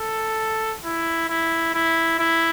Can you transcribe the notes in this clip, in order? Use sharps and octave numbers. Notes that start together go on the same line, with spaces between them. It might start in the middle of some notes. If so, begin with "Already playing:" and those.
Already playing: A4
E4
E4
E4
E4